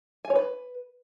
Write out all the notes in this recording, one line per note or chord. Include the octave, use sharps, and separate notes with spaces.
G#5
C#5
B4